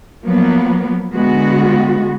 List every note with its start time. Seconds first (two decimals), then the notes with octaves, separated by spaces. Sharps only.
0.24 F3 F#3 A#3 B3
1.14 D3 G#3 B3 F#4